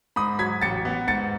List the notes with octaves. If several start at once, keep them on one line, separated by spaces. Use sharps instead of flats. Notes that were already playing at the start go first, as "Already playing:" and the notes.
G#2 B5 D#6
F#3 G#6 B6
A1 A6 C#7
B3
G#2 A6 C#7